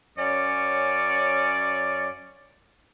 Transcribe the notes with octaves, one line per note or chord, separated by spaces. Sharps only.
F#2 C#4 C#5 D5